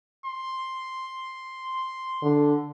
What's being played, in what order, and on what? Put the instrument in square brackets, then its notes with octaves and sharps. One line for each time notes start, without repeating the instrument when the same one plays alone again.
[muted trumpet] C6
[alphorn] D3